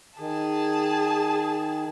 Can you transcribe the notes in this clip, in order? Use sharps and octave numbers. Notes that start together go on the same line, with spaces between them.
D#3 G#4 A5